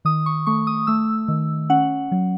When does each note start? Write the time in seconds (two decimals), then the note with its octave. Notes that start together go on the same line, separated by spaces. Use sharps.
0.05 D#3 D#6
0.26 C#6
0.46 A3 C#6
0.67 D#6
0.87 A3 E6
1.28 D#3
1.70 C#4 F#5
2.12 F#3